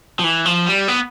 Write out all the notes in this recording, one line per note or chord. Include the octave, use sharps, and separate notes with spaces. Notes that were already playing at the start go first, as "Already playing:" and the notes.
F3
E3
F3
G3
B3